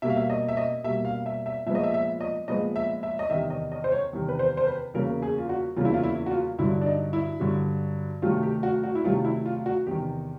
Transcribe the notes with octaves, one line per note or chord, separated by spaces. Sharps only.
B2 G3 A#3 E5
F5
E5
D#5
E5
D#5
B2 G3 A#3 E5
F5
E5
E5
A#2 F3 G#3 B3 E5
D#5
E5
E5
D#5
A#2 F3 G#3 B3 D#5
E5
E5
D#5
E2 C3 D#3 E5
D#5
D#5
C5
C#5
E2 C3 D#3
B4
C5
C5
B4
E2 C#3 F#3 A#3 A#4
G#4
F4
F#4
E2 C#3 F#3 A#3 F4
E4
F4
E4
F#4
F4
G2 D3 F#3 E4
D4
D#4
E4
G2 D3 F#3
C3 D#3 F#3 A3 F4
G4
F#4
F#4
E4
C3 D#3 F#3 A3 F4
E4
F4
F#4
E2 C3 D#3 G4